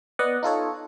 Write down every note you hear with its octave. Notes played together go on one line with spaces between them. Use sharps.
B3 D5 D#5 F#5
D#4 F4 A4 C#5